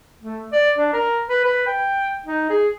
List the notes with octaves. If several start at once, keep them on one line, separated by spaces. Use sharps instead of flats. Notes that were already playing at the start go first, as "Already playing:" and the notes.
A3
D5
D4
A#4
B4
B4
G5
D#4
G#4